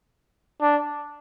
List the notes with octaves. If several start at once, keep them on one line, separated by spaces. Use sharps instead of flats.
D4